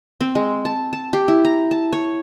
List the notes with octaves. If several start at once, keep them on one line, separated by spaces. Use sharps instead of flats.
C4
G#3
A5
A5
G4
E4
A#5
A5
C#5